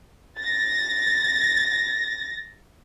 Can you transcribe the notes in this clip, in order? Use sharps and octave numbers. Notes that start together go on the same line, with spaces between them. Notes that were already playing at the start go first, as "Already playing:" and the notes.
A6 A#6